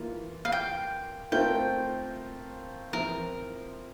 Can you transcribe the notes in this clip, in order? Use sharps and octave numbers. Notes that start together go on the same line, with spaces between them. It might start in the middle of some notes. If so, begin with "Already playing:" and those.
Already playing: E3 A#3 F4
F5
G5
A3 C4 F4 A#4 G5
F3 C4 E4 A#4